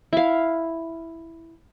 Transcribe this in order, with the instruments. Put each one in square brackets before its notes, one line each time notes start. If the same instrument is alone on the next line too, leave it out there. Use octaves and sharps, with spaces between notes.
[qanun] E4 F5